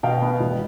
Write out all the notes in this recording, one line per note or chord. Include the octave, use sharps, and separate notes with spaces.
B2 F5 G5
B3
E1